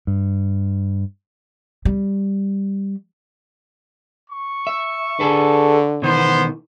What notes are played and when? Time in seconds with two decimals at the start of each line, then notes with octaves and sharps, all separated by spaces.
0.07 G2
1.85 G3
4.29 C#6
4.67 E5
5.20 D3 G#4 A4 B4
6.02 B2 D#3 E3 B3 C5